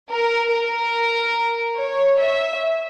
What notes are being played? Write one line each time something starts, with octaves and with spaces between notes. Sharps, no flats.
A#4
A#4
C#5
E5